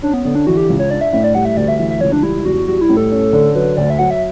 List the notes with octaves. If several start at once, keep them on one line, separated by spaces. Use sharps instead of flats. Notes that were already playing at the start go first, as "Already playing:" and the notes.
C#4 D4
B3
D3 B3
D4
E3 F#4
G4
C#2
C#5
D4 D5
E5
A2 E5
D5
G3 F#5
E5
D2 D5
E5
E3 E5
E5
C#2 C#5
D4
G3 E4
E2 F#4
G3 F#4
E4
A2
A4
C#4
D3
F#3 B4
D2 D5
E5
F#3 F#5
E5